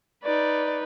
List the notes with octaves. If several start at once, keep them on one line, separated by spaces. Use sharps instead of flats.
D#4 B4 D5